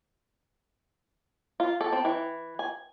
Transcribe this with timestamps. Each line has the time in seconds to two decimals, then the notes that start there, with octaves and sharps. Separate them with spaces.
1.60 F4
1.81 A4
1.92 C4
2.05 E3
2.59 G#5